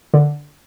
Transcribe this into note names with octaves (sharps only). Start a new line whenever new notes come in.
D3